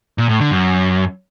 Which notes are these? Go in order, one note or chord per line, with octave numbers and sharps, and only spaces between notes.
A#2
A2
D3
F#2